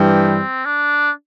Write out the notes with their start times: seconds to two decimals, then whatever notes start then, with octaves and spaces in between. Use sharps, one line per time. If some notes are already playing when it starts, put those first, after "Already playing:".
Already playing: G2 E3 G3 C4
0.65 D4